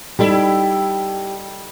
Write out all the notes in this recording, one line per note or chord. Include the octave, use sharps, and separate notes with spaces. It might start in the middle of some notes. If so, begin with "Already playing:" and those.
G3 D#4 E4 G4 A4